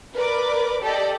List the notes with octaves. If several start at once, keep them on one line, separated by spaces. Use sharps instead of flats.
A#4 B4 D5 D6
G4 A4 D5 D#5